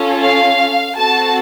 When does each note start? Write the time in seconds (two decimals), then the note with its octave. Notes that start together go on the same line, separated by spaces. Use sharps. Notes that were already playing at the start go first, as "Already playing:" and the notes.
Already playing: C#4 F4 A4
0.21 F5
0.96 C4 F#4 A4 A5